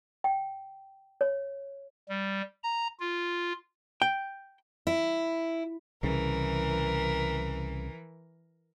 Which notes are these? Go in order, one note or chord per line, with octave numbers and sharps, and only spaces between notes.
G5
C#5
G3
A#5
F4
G5
E4
C2 C#3 E3 A#4